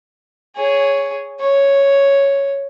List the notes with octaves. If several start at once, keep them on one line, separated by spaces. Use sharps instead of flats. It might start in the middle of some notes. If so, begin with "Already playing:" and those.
G#4 C#5
C#5